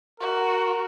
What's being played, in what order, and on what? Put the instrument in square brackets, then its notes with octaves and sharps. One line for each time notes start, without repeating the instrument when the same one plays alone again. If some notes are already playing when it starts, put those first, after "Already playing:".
[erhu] F#4 [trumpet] A#4